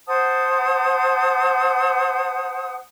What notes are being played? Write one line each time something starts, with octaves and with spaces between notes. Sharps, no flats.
C5 F#5 A5 D#6